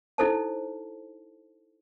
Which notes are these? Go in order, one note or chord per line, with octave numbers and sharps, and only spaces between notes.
D#4 E4 A4 C5 A5